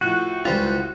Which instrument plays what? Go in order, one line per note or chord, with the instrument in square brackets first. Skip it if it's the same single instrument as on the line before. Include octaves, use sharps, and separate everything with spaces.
[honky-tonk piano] A2 F3 F#6 [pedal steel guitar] F#4
[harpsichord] C#2 G3 [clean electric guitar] F4 C5